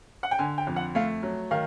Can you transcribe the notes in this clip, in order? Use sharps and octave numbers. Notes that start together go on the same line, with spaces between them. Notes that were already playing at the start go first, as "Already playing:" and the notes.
F#5
G5
D3 G#5
G5
F2
F#5
A3 F5
F#3
D#3 F5